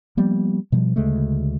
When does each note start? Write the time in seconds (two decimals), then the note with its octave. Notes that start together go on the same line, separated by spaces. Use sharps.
0.17 F3 G3 A#3 B3
0.72 B2 F3 G3
0.96 D2 C#3 G#3 A3